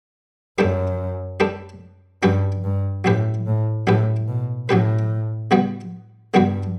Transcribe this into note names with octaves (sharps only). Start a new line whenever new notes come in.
F#2 A3 D4 G4 B4
A3 D4 G4 B4
G2 F#3 C#4 G4 B4
G2
A2 F#3 C#4 G4 B4
A2
A2 F#3 C#4 G4 B4
B2
A2 F#3 C#4 G4 B4
C#3 G3 B3 F#4 B4
G2 C#3 G3 B3 F#4 B4